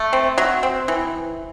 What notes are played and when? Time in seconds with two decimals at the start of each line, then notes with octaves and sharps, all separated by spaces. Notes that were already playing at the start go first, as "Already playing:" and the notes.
Already playing: A3
0.13 C4
0.38 F#3
0.63 C4
0.88 E3